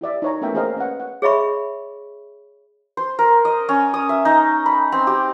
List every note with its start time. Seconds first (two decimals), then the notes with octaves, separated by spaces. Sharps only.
0.01 E4 G4 D5 E5
0.22 D#4 C#5 A#5
0.41 A3 B3 C#4 A#4 E5 G5
0.54 A#3 G#4 A#4 C5 D#5 F5
0.77 C#4 B4 F#5
1.00 F#5
1.22 G#4 C#5 D#5 E5 B5 C#6
2.97 C5
3.19 A#4
3.45 D#5
3.69 C#4
3.94 D#6
4.09 E5
4.25 D#4
4.66 B5
4.92 C4
5.07 G4